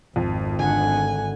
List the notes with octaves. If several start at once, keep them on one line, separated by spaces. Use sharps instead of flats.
G#1 F2
D3 F#5 G#5